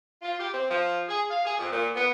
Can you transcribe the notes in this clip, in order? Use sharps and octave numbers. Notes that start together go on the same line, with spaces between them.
F4
G4
C4
F3
G#4
F5
G#4
F2
A#2
B3